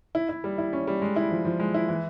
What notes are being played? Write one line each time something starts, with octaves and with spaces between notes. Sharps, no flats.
E4
E4
G3
E4
C#4
G3
G#3
E4
F3
F3
G#3
E4
E3